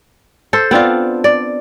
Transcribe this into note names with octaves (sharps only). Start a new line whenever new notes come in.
A4 C5
B3 C4 D4 F4
D5